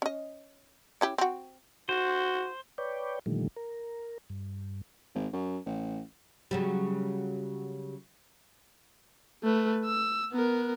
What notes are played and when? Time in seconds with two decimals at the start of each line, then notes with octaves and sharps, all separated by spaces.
0.02 C#4 D#5
1.01 C#4 E4 G4
1.18 C4 F#4
1.89 F#4 C5
2.78 B4 C#5 D5 G5
3.26 A#2 D3 D#3 F3 G3 A3
3.57 A#4
4.30 G2
5.15 G#1
5.33 F#2
5.66 A1
6.51 C#3 F#3 G3
9.43 A3 B4
9.86 E6
10.33 B3 A#4